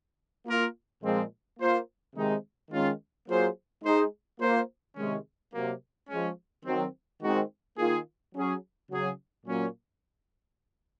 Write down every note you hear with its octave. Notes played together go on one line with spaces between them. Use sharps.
A#3 F4 A#4
A#2 F3 G#3 C4
A#3 F4 C5
C3 D#3 G#3 D#4
D#3 G#3 C#4 F4
F#3 A#3 F4 G#4 C5
G#3 D#4 G#4 C5
A#3 F4 C5
C3 D#3 G#3 C#4
C3 F#3 A#3
F3 G#3 C#4
D#3 F#3 C4
D#3 G#3 C4 F#4
D#3 A#3 F4 G#4
F#3 C#4 G#4
C#3 F#3 C#4 G#4
A#2 F#3 A#3 C#4